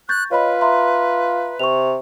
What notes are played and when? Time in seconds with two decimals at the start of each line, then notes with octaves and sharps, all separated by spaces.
0.09 C#6 F#6 G6 A6
0.31 F4 B4 C#5 D#5 B5
0.61 E5 A#5 C6
1.59 C3 C#6 F7